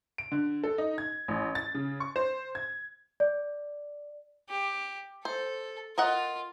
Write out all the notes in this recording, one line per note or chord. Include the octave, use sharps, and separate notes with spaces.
D7
D3
A4
D#4
G#6
A1
A6
C#3
C#6
C5
G#6
D5
G4
A4 C5
F4 A#4 D#5 F#5 C6